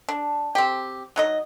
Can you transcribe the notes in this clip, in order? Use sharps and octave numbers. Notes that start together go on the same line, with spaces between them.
D4
C4 G4
F#3 D#4 D#5